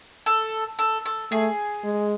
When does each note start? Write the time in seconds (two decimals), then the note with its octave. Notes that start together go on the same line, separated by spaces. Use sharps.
0.26 A4
0.79 A4
1.05 A4
1.32 A3 G#4
1.83 G#3